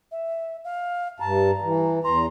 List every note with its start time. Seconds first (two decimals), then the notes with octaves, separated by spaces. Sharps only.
0.11 E5
0.64 F5
1.20 G2 A5 A#5
1.62 E3
2.04 E2 A#5 C6